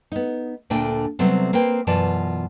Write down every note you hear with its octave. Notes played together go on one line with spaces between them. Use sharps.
B3 D#4
D2 A#2 A3 D4 G5 G#5
C3 F#3 G3 A3 B3 C4
A#3 C4 B4 G5
F#2 B2 E3 F4 D5 A5